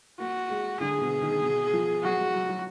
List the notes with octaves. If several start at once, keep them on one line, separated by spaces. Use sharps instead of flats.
A#3 F#4
G#3
D3 G#4
B2
D#3
B2
F3
F#3 F#4
G#3
F#3
F#3